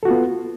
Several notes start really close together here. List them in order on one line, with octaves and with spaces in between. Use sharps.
A4 F#4 F4 B3